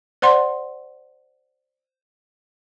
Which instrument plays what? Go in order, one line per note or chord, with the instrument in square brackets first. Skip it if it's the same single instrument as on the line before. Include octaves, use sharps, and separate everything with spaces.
[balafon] C5 D5 F#5 C6